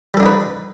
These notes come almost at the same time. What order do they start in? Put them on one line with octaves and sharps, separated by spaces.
G3 A4 D4 D#4 B4